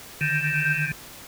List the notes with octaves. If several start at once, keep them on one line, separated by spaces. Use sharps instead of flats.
D3 D#3 G6 E7